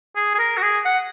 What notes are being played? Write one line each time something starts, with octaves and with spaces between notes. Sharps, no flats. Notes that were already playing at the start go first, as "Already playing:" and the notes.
G#4
G#4
A#4
F#4
G#4
F#5